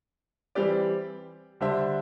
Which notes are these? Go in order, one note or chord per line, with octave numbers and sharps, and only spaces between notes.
E3 G3 C4 G4 D5
D3 G3 D4 C5 E5